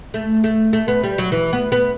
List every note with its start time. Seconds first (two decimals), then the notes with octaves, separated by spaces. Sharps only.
0.14 A3
0.44 A3
0.73 A3
0.88 B3
1.04 G3
1.18 F#3
1.32 E3
1.53 B3
1.72 B3